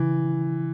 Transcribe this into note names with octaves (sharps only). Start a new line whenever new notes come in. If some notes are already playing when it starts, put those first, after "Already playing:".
Already playing: C#3 E3